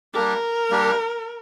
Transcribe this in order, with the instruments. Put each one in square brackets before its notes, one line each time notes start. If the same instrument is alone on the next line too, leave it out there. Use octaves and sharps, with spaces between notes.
[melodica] G3 A#3 D4 G4 [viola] A#4
[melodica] G3 A#3 D4 G4